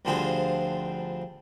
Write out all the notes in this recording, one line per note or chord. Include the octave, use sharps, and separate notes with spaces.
D2 D3 F3 G3 C4 G#4